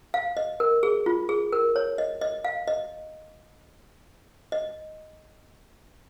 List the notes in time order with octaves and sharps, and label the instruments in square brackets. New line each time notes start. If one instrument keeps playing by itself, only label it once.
[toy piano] F5
D#5
A#4
G#4
F4
G#4
A#4
C#5
D#5
D#5
F5
D#5
D#5